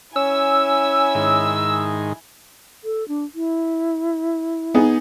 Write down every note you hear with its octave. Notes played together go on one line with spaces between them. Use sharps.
C#4 E4 G#5 E6
G#2 D#3
A4
D4
E4
B3 D#4 G#4